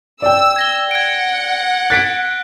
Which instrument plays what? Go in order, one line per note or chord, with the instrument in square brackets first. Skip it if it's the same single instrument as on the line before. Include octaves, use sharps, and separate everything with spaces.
[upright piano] D5 G5 [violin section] E6
[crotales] G#6 A#6 G7
[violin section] F#5 [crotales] G#6 D7
[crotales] F#6 G#6 [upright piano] A6 B6 D7